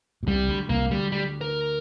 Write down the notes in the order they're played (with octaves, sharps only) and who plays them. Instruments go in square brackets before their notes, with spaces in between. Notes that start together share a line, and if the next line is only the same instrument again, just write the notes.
[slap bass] A#2
[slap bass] C2 C3 [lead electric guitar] G3
[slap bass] D2 D3
[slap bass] C2 C3 [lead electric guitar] A#3
[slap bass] D2 D3 [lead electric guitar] G3
[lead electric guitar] G3
A#4